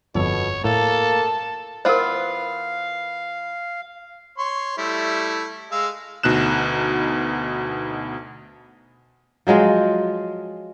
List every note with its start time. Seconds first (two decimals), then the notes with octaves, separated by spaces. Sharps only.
0.15 G1 F2 B2 A4 C#5
0.64 A2 A#3 A4 A5
1.85 E3 B3 F4 A#4 C5 F5
4.38 C#5 C6 C#6
4.78 G3 A3 E4
5.71 G#3 F5 E6
6.23 D2 B2 D#4 F#6 E7
9.47 F3 F#3 G#3 F4